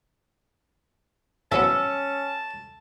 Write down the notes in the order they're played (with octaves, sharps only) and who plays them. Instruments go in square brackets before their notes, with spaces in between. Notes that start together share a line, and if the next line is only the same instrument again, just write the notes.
[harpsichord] E3 F#3 B3 [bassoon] C#4 [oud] A4 [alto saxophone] A5